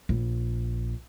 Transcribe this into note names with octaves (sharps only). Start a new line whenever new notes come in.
A#1